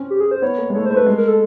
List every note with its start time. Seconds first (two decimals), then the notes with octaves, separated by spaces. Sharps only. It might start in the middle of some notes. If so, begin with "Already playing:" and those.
Already playing: C4 C#4
0.10 G4
0.20 G#4
0.31 C5
0.42 B3 C#5
0.58 A#3
0.70 G#3
0.74 A3 C#5
0.86 C5
0.91 A3
0.96 B4
1.06 G#3
1.17 A#4
1.28 A4